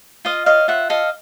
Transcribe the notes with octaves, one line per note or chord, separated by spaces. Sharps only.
F4 D#5 F5
C#5 D#5 F5
F4 E5 F#5
A4 D#5 F5